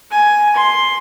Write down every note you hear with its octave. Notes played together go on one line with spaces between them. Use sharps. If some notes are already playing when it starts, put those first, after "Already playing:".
G#5
C6